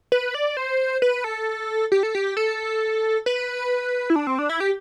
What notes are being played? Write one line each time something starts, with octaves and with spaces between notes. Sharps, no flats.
B4
D5
C5
B4
A4
G4
A4
G4
A4
B4
E4
D4
C4
D4
E4
G4